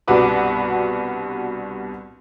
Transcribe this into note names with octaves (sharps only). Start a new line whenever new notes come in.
C2 G2 B2 F#4 B4 D6